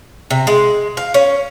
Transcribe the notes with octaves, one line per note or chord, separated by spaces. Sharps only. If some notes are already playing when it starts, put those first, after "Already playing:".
C3
G#3
F5
C#4